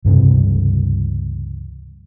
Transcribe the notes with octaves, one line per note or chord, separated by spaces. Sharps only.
C#2 G2 C3 E3